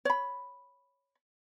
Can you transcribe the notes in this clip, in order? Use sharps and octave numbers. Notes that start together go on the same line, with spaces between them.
C#5 B5